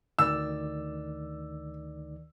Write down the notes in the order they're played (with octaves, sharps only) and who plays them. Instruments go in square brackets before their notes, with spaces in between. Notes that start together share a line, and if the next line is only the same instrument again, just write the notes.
[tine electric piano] D2 D#3 D5 [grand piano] E6